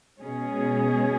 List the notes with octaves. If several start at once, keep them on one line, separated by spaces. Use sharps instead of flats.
B2 G#3 C#4 G#4